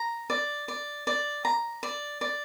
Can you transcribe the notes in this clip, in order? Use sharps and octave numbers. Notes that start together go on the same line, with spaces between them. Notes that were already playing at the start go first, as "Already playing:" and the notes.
Already playing: A#5
D5
D5
D5
A#5
D5
D5